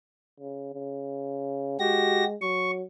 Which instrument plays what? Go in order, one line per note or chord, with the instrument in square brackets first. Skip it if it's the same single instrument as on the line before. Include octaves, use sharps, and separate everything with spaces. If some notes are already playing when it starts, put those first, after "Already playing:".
[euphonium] C#3
C#3
[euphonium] G#3 [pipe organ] F#4 G4 A#6
[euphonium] F#3 [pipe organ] C#6